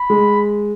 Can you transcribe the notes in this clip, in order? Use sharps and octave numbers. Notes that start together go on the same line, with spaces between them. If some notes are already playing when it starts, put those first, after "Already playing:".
Already playing: B5
G#3